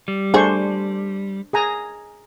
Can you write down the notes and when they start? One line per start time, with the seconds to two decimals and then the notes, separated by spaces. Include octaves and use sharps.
0.08 G3
0.34 A3 D4 G#4 C5 C#6
1.53 G#4 G#5 A#5